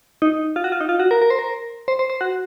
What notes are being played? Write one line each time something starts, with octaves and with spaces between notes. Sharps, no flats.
D#4
F4
F#4
F4
D#4
F4
F#4
A#4
A#4
C5
A#4
C5
C5
C5
F#4